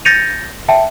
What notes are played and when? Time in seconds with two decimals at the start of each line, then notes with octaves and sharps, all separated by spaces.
0.05 G6 A6 A#6 C#7 D#7 F7
0.68 E5 G5 A5